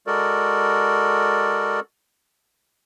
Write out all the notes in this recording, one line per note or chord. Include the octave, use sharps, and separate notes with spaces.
G#3 F#4 A4 A#4 D5